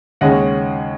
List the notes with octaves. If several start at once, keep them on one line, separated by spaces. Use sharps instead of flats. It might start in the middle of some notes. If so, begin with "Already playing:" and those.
D#2 C#3 G#3 C#4 D#5 F#5